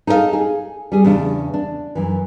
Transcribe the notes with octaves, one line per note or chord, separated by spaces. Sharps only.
D#4 G#4 A4 D5 F5
G#4
G3 G#4
E2 C#3 D4
D4
F#2 E3